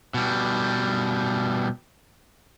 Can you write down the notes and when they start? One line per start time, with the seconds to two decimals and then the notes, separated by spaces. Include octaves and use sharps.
0.14 B2 G3